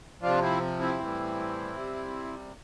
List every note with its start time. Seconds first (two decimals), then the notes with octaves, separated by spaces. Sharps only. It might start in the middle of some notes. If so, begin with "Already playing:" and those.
0.22 C3 F3 D4 F4
0.42 C4 E4
0.80 C4 E4
0.99 A2 E3 G3
1.76 C3 G3